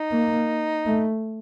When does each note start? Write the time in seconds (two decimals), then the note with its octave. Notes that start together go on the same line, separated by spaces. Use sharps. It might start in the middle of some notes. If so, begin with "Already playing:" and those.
Already playing: D#4
0.12 A#3
0.86 A3